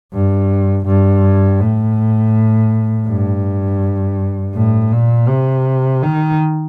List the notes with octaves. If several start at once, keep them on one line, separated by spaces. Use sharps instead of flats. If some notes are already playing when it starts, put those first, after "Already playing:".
G2
G2
A2
G2
A2
A#2
C3
D#3